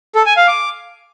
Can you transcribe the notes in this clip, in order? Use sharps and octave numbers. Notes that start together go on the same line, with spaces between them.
A4
G#5
F5
D6